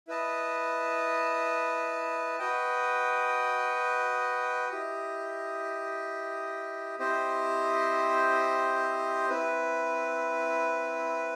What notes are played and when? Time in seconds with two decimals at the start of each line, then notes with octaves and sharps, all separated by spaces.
0.08 E4 B4 D#5 A5
2.39 F#4 B4 D#5 G5
4.69 E4 G4 D#5
6.99 C4 E4 G4 C5 D#5
9.30 C4 E4 B4